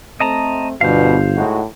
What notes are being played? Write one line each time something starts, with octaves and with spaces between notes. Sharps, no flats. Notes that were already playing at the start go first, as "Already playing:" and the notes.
A3 C4 D#5 A5 A#5
G1 G2 B2 C5 F5
A2 G#3 D#4 F#4